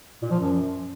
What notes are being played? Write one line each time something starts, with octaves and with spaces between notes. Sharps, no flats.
A#2
F3
F#2